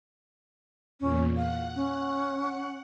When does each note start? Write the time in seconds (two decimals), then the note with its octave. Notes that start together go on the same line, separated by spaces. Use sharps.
1.00 E2 A#2 C#4
1.37 F5 F#5
1.75 C#4